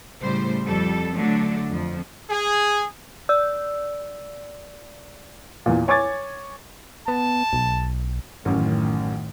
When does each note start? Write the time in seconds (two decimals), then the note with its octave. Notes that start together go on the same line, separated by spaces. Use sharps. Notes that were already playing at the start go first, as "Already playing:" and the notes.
0.22 A2 C#3 G3 C5
0.66 F2 G3 A4
1.13 D3 F#3 A3 D4
1.70 F2 F3
2.30 G#4
3.29 D5 E6
5.66 E2 A#2
5.88 C#5 G#5 C#6 D6 G#6 A6
7.08 B3 A5
7.53 B1
8.45 A1 F#2 A2 D#3